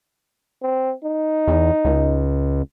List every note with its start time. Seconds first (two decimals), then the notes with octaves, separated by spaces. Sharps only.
0.62 C4
1.04 D#4
1.47 E2
1.85 C#2